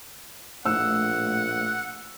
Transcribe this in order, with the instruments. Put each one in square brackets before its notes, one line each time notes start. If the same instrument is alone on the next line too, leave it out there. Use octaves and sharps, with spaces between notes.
[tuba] A#1 [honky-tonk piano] A2 [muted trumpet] F#5 [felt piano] E6